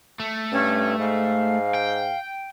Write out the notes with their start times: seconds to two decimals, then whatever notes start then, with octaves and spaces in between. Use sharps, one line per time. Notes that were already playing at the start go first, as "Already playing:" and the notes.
0.20 A3
0.52 G2 C#4
1.00 G#2 F5
1.75 G5